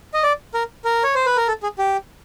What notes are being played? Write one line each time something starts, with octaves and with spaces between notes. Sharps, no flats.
D#5
D5
A#4
A#4
C#5
C5
B4
A#4
A4
G#4
G4